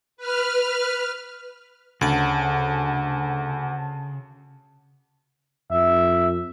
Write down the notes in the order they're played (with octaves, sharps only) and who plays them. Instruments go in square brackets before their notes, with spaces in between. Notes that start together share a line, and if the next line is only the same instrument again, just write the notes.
[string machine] B4 F6
[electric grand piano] D2 [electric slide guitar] C#3 [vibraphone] F#5 A5
[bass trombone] F2 [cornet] E5